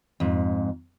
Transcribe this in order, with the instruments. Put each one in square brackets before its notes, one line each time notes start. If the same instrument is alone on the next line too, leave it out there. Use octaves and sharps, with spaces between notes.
[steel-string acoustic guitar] F2 G#2